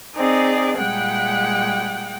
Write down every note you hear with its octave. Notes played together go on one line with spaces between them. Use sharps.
C4 D#4 G#4 D5
A#2 G3 G#3 F#5 G5